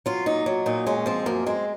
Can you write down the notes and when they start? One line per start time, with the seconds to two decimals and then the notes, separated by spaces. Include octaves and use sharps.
0.06 F#3 F4
0.26 A#2 D#4
0.46 F#3
0.66 A#2 D#4
0.87 G#3 C#4
1.06 F3 C4
1.26 F#2 A#3
1.46 G#3 C4